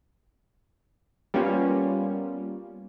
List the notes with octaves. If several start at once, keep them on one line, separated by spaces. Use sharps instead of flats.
G3 A#3 B3 C#4 F4